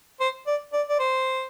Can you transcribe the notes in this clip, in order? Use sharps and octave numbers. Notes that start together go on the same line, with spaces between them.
C5
D5
D5
D5
C5